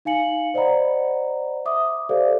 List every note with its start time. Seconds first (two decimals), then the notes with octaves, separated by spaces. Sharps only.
0.05 D#4 F5 G#5 C#7 F#7
0.54 C5 D5 D#5 F#5 A#5 B5
1.65 E5 D6 D#6
2.09 G4 A4 C5 D5 F5